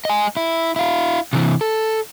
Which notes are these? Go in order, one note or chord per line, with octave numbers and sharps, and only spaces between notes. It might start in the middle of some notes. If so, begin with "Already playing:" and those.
D#5 G#5
E4
E4 F5
C3 E3
A4